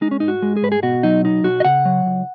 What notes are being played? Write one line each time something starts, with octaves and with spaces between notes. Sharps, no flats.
G#3 D#4
C#4
G#2 D#4
F#4
G#3
G#4
G#2 B4
G#4
B2 F#4
F#3 D#4
B1 D#4
B1 F#4
D#5
C#3 F#5
F#3
C#2